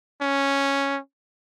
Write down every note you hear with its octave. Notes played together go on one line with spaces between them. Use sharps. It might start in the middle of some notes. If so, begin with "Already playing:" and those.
C#4